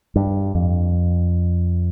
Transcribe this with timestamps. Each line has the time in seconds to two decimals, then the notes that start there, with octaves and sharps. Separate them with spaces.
0.16 G2
0.55 F2